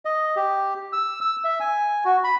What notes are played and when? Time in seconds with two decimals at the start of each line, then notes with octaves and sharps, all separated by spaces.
0.05 D#5
0.36 G4
0.93 E6
1.21 E6
1.44 E5
1.60 G#5
2.05 F#4
2.24 B5